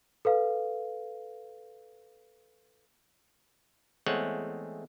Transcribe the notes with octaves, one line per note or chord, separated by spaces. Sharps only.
A4 B4 F5
E2 G#3 A3 C4 C#5 F#5